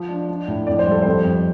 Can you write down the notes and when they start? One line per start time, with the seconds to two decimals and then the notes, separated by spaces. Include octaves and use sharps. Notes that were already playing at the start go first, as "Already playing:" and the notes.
Already playing: F3
0.09 D4
0.29 D4
0.48 A2
0.67 F2 D5
0.79 C5
0.87 G3 A4
1.02 F2 C5
1.25 F2